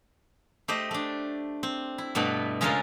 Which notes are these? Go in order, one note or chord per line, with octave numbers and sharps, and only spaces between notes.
A3 G4 C5 D#5
A3 D4
C4
E4
G2 B2 A3 B3
C#3 G#3 C#4 F4 A4 A#4